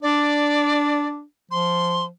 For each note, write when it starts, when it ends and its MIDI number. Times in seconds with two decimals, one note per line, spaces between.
0.02 1.23 62
0.02 1.08 74
1.51 2.09 53
1.51 2.05 84